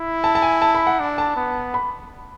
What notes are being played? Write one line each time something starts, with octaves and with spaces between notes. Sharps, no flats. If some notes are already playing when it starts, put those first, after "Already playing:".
Already playing: E4
A5
A5
G#5
A5
B5
F#5
D4
A5
B3
B5